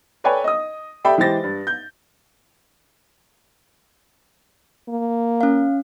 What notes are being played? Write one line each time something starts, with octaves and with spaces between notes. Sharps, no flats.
A4 B4 C#5 D5 G5 G#5
D#5 D#6
G4 A4 D5 E5 G5 B5
E3 G#3 G4 C5 A6 A#6
G2
G6
A#3
C#4 F5